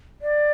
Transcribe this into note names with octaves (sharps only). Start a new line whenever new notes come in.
D5